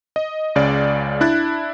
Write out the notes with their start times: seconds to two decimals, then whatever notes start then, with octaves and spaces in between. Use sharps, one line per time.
0.16 D#5
0.55 C#2 C#3 D5
1.21 D4 E4 F#6 A6